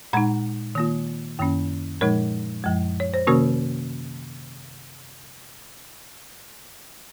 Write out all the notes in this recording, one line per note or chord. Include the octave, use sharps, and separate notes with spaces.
A#2 G#3 D#4 F#5 A#5
D#3 A#3 F4
F#2 D#3 A#3 C#4
A#2 F3 G#3 D#4 A#4 C#5
F#2 F3 G#3
C#5
C5
C3 D#3 A#3 C#4 F#4 A#4